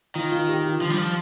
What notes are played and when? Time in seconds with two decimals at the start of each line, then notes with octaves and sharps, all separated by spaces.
0.15 D#3 F4
0.32 F4
0.49 G4
0.65 F4
0.81 F3 D4
0.90 G3
0.98 F3